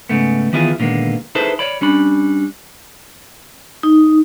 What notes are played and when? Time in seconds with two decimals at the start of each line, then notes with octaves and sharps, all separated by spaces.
0.09 G#2 C#3 A3 B3
0.53 D#3 E3 B3 E4 F4 G#4
0.80 A#2 D3 D#3 G#3 A#3 B3
1.35 D#4 E4 G#4 A4 B4 C5
1.59 C#5 D5 B5
1.81 G3 C#4 D4 B5
3.83 D#4